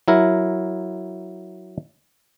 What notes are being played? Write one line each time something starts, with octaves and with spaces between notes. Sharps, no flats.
F#3 E4 A#4